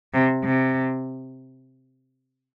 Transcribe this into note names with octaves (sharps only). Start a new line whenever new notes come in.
C3
C3